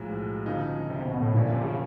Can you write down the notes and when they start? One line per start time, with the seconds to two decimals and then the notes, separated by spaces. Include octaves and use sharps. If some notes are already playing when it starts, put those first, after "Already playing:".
Already playing: B1 A2 F3 G#3
0.46 D2 C#3 F3 A#3 D#4
0.90 C3
1.05 B2
1.20 A2
1.34 F#2 A#2 D3 F3 A#3 C#4
1.50 C3
1.64 C#3